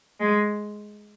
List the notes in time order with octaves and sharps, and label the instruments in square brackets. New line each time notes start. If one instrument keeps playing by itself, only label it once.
[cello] G#3